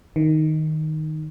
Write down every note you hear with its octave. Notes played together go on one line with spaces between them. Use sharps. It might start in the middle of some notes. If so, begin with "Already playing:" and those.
D#3